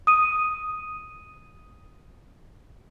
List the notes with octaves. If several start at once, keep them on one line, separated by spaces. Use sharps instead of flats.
D#6 D#7